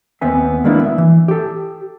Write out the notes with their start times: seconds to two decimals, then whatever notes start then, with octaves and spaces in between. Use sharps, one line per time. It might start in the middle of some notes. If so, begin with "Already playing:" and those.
0.21 D#2 B3 C4 E5 G#5
0.64 D#3 G#3 A#3 B3 D4 E4
0.84 E5
0.98 E3
1.28 G4 A4